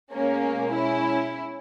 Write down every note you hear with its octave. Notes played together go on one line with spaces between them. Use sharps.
B2 G#3 A#3 C#4
C#4 E4